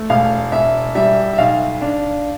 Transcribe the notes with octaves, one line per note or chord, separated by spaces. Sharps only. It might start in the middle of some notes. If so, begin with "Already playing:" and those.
Already playing: A3
E1 F5
E1 E5
G3 E5
E5
B1 F5
D4